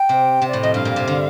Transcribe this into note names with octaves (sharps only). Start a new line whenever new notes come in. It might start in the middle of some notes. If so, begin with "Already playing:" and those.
Already playing: G5
C3
C3
D5
A2
F2 D#5
G2 F5
A#2
C3
D3